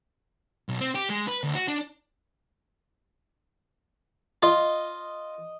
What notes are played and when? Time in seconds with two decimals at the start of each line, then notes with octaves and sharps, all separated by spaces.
0.69 B1
0.81 C4
0.95 G4
1.10 G#3
1.28 B4
1.43 D2
1.55 F#4
1.68 D4
4.43 F4 D#5